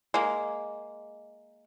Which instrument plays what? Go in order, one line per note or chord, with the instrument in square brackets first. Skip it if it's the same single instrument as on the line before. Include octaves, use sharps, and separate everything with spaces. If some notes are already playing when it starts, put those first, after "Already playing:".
[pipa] G#3 A#3